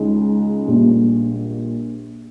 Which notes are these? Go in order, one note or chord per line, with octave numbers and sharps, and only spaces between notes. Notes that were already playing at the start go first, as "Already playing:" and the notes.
Already playing: C#2 C#3 G#3 D#4
A#1 A#2 G3